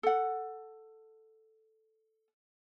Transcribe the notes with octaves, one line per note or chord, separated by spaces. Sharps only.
A4 F#5